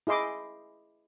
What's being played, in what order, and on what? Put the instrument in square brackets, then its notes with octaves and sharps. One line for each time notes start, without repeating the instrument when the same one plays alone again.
[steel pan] E4 G#4 D#5 C6 D6